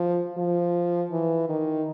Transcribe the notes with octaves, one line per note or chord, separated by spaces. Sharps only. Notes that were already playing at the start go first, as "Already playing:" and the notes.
Already playing: F3
F3
E3
D#3